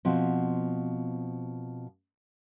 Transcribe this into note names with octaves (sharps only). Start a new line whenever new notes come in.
B2 F3 C4